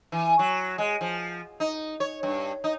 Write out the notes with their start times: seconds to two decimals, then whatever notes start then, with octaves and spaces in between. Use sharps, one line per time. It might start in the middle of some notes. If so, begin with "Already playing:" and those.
0.12 E3
0.39 F#3
0.78 G#3
1.01 F3
1.60 D#4
2.00 C#5
2.23 G2
2.64 D#4